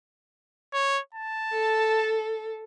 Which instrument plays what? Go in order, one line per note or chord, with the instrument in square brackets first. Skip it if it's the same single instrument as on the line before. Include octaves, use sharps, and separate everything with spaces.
[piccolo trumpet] C#5
A5
[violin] A4